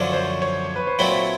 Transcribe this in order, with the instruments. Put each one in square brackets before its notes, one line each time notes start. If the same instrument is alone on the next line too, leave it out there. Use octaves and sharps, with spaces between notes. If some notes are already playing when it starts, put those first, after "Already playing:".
Already playing: [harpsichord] F#2 D3 F3 A3 D4 [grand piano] C#5
[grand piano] C5
C#5
B4
C5
[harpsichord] A#2 F#3 A3 C4 E4 [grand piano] C#5